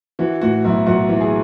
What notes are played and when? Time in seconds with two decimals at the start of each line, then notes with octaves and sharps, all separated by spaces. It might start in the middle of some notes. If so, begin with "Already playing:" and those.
0.19 E3 F#4
0.41 A2 F#4
0.64 B1 E4
0.86 B1 F#4
1.09 E3
1.20 G#4